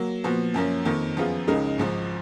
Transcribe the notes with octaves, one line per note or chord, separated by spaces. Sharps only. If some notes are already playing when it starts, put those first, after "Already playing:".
Already playing: F#3 A#3
A#2 F3 B3 F#4
F#2 F3 A#3 C#4
F2 D#3 A#3
F#2 F3 B3 F4 G#4
C#2 C#3 G#3 D#4 A#4
G#1 G#2 F3